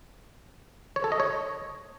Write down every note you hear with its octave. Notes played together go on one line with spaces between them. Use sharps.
C#5
A4
D#5
C#5